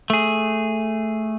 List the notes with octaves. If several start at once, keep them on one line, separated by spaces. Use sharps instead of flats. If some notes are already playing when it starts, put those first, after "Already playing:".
A3 G#4